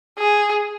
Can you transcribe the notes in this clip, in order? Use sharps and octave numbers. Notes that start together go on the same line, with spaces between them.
G#4